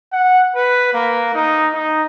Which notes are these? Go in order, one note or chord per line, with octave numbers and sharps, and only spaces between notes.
F#5
B4
A#3
D#4
D#4